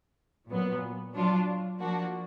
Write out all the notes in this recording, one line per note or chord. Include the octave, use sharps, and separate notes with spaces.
A#2 F#3 B3
F#3 D4 F4
F3 A#3 D4 F#4